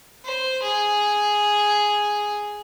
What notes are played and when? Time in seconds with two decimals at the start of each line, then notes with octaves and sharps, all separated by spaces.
0.25 C5
0.62 G#4